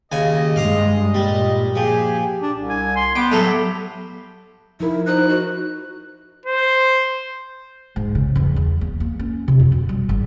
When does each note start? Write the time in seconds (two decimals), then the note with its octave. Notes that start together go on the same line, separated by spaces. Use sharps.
0.12 D#2 C#3 D#5 G#5
0.56 G2 G#3 F5 D6 D#6
1.14 A#2 G3
1.75 F3 G4 G#4
2.42 D4
2.58 C2
2.70 G#5
2.96 C6
3.16 B3 G4 G5
3.32 A2 F#3 A3
4.80 F3 D#4 E4 A#4
5.06 D#4 C5 F#6
5.29 F#4
6.46 C5
7.96 G#2
8.15 C#3
8.35 E2
8.56 E2
8.81 B3
9.00 A#3
9.19 C#4
9.48 C3
9.60 F2
9.72 B2
9.89 G3
10.09 G#1